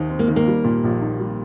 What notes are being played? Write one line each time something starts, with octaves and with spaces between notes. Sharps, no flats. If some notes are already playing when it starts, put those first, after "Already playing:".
Already playing: D#2 D#3 C4 D#4
C4
A#3
D#3
A#3
G3
A#2
A#1
D#4
G3